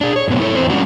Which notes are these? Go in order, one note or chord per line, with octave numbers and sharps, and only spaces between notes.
D4 G#4
C#5
F#2 A2 C3 B3
E4 A4 C#5
E2 C4 C5
G3 G#3 C#4 D4 F#4